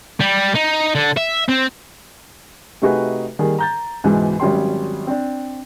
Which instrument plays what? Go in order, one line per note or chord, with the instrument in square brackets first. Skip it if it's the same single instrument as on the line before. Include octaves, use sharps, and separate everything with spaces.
[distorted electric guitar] G3
D#4
D3
E5
C4
[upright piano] C3 A3 D#4 F#4 G#4 B4
D#3 G3 A#3 G#4
A#5 G6 A6
C#2 G#2 B2 E3
G#1 F#3 G3 C#4 G5 C6
C4 D4